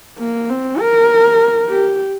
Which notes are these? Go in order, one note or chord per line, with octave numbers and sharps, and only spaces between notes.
A#3
C4
A#4
G4